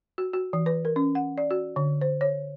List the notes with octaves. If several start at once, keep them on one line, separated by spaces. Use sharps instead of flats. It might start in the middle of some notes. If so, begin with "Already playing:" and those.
F#4
F#4
E3
B4
A#4
C#4
F#5
D5
F#4
D3
C5
C#5